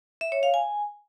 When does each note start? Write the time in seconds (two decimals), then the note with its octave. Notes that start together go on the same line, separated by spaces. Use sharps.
0.21 E5
0.32 C#5
0.43 F5
0.54 G#5